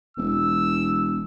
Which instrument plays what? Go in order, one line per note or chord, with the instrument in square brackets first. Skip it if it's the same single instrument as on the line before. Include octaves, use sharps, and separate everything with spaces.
[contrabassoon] E1 [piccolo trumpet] E6